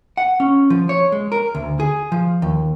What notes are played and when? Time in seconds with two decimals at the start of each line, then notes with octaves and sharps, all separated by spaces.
0.17 F#5
0.40 C#4
0.70 F3
0.89 C#5
1.12 G#3
1.32 A#4
1.55 D2
1.80 G#4
2.12 F3
2.42 D#2